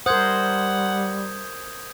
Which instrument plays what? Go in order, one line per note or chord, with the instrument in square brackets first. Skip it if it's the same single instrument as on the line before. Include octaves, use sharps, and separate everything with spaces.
[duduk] G3 [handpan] A#4 C5 [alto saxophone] F#5 [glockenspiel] D#6 G6 G#6